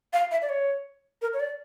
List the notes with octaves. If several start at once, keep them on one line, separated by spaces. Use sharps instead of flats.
F5
E5
D5
C#5
A#4
C#5
D5